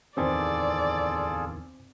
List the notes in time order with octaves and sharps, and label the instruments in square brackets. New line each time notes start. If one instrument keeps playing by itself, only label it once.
[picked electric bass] D1 E2 D#3 [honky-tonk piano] C4 [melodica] F4 G#4 A4 [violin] D5